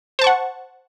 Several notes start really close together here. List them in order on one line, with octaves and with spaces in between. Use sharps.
C5 A5 C#6 F#5